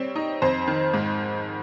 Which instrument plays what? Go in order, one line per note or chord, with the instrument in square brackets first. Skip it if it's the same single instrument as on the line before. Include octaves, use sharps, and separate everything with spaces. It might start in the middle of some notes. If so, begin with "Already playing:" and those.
Already playing: [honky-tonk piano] G3 C4 C#5
D#4
F2 C5
D#3
G#2